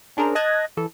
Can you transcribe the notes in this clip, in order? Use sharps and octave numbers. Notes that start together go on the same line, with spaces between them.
C#4 D4 G#4 A#4 C5 A#5
D#5 A5 D#6 F#6 G#6 A#6
E3 A4